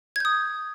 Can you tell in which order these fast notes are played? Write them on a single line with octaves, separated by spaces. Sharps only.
G#6 G6 D#6